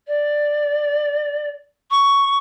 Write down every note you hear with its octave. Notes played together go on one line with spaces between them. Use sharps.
D5
C#6